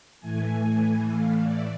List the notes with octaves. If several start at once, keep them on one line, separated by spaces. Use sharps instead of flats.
A2 E3 A3 G#5
F5
D5